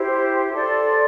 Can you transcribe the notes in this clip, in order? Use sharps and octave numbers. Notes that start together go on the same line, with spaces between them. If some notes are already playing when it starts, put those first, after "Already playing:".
Already playing: E4 G4 C5
A4 D5 C6